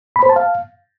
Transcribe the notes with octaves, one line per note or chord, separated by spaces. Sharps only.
B5
C5
A5
F5